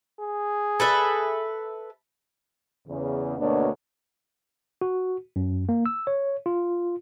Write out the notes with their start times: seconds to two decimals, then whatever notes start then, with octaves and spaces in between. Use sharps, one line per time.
0.21 G#4
0.80 A4 B4 E5
2.88 E2 C#3
3.38 D2 B2 A#3 B3 D4 C#5
4.81 F#4
5.36 F#2
5.69 A#3
5.86 E6
6.07 C#5
6.46 F4